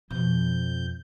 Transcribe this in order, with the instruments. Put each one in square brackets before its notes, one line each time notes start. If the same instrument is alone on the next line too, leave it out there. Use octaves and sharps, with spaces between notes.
[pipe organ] F2 G6 [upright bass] B2 F3